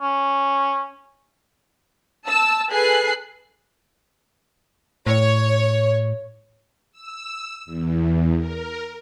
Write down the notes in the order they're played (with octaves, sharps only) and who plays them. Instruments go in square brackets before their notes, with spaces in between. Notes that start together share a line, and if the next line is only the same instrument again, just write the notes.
[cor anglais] C#4
[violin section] A5 E6
G#4 A4 B4 G#5 F#6 C7
[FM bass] A2 [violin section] C#5
[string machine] E6
E2
A#4